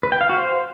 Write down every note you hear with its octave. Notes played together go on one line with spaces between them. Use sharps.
B4
G5
F5
F#4
C5